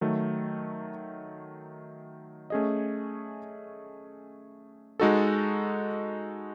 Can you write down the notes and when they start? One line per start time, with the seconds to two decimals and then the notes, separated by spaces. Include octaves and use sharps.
0.01 D#3 F#3 A3
2.50 A3 C#4 G#4 D#5
5.00 G#3 D#4 F#4 A4